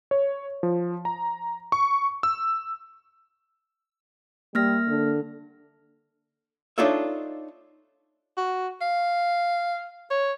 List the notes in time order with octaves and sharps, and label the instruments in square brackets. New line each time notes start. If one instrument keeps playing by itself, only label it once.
[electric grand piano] C#5
F3
A#5
C#6
E6
[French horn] G3 [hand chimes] A#3 F6 A#6
[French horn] D3
[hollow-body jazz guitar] D4 D#4 F4 A4 C#5 E5
[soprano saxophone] F#4
F5
C#5